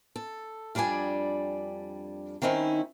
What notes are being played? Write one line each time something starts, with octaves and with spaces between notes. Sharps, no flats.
A4
F2 G3 D4 D5 G#5
D#3 C4 C#4 D#4 E4